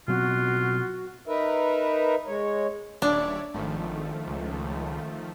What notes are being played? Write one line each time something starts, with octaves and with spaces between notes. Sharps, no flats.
B2 F#3 C4 F4 F#4
D#4 A#4 B4 E5
G#3 C#5
D#1 D4 C#5 D5 E5
G#1 D#3 F3 A3
C#2